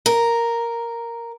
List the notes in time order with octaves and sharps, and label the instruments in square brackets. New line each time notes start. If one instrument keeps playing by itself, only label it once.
[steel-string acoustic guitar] A#4